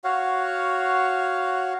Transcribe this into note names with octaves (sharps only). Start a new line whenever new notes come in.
F#4 C#5 F5 F#5